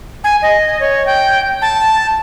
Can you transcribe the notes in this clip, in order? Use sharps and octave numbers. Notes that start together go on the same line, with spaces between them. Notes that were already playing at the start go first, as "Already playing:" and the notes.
G#5
D#5
C#5
G5
A5